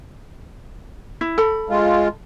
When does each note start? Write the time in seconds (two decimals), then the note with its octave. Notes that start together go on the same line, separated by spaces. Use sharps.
1.21 E4
1.38 A4 B5
1.70 G#3 F4